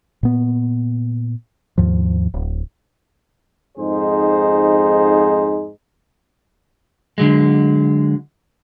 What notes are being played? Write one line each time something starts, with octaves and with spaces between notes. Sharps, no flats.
A#2 B3
D#2 G#2 F3
D1
F2 G#2 D#4 G#4 C5
D3 F#3 G#3